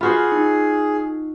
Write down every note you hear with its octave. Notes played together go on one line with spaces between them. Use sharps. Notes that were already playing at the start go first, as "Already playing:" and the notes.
F4 F#4 G#4 C5 B5
D#4